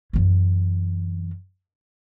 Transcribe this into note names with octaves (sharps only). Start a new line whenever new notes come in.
F#2 E3